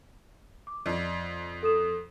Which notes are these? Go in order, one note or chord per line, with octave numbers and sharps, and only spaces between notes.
D6
F2 D5 D#5
A4 D#6 E7